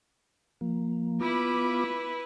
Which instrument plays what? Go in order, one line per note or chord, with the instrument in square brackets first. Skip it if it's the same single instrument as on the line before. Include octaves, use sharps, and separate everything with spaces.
[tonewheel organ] F3 A#3
[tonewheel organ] B3 F4 D6 [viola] E4 B4